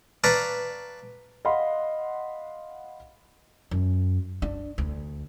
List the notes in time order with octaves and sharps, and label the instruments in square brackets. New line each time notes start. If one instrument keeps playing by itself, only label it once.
[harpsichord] B4 D5 F5 A5 A#5 C#6
[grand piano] D#5 F5 F#5 B5 C6
[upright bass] F#2
D4
D2